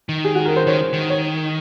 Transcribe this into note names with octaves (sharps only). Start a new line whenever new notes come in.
D#3
G#4
F#4
A#4
C5
D#3 C#5
D#3
C#5